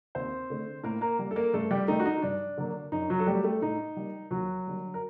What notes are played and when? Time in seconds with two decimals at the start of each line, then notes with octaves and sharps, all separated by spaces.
0.15 D#2 C4 C5
0.50 D3 A3
0.83 A2 A#3 A#4
1.01 A#3 A#4
1.19 G3 A#3
1.31 A4
1.36 A#3 A#4
1.53 G2 A3 A4
1.71 G3 G4
1.88 D#3 A3 D#4
2.00 F#4
2.06 D#4
2.22 G2 D4
2.57 D3 F#3 A#3
2.92 F#2 D#4
3.10 F#3 F#4
3.19 A4
3.26 F#3 G3 A3 G4
3.44 A3 A4
3.62 A2 D#4
3.97 G3 A#3
4.31 D#2 F#3 F#4
4.66 D3 G3 A#3
4.94 A#4